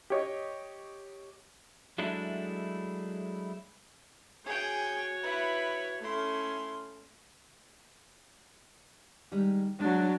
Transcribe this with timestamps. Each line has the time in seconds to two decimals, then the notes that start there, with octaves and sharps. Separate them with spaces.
0.10 G4 C#5 D#5
1.98 F#3 G#3 A3 D4 E4
4.46 F#4 G#4 C#5 G5
5.23 E4 B4
6.02 A3 C#4 E4 C6
9.32 D#3 G3 G#3
9.80 F#3 G#3 D4